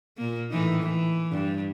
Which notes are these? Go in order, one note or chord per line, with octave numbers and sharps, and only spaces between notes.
A#2 A#3
A2 E3 D#4
E3
G2